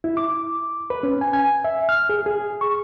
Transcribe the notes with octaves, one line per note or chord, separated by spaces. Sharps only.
E4
D6
B4
C#4
G#5
G#5
E5
F6
G#4
G#4
C#6